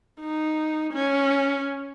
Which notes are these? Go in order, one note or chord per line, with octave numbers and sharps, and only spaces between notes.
D#4
C#4